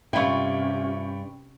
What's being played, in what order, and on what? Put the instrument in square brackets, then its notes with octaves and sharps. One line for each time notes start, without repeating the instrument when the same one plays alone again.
[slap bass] G2 [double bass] C3 C#4 [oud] E4 F4 [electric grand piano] G5 B5 C#6